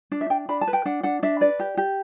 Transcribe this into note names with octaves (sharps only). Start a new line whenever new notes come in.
D4
E5
D4 G5
D4 B5
A5
B4
G5
D4 F#5
D4 F#5
D4 E5
B4 D5
G4
G4